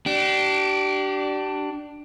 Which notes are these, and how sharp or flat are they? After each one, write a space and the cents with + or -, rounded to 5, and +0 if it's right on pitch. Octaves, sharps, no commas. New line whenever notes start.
D4 +5 G4 -35